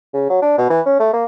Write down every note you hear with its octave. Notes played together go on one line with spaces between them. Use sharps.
C#3
F#3
D4
B2
E3
C#4
A3
A#3